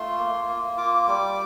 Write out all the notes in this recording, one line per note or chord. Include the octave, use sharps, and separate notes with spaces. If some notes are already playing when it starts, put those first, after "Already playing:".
Already playing: A3 F4 C6
A#3
A#3
F4 D6
G3